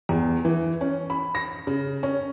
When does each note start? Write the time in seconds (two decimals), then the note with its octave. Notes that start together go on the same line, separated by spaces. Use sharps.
0.09 E2
0.45 E3
0.81 C#4
1.10 B5
1.35 A#6
1.67 C#3
2.03 C#4